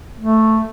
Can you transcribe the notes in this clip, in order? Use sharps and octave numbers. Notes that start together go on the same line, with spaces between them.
A3